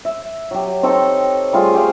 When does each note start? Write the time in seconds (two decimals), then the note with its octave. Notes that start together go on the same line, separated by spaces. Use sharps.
0.05 E5
0.51 F#3 G4
0.83 C4 D#4 A4 C#5
1.53 G3 A3 F4 G#4
1.74 G4 C5 C#5 F5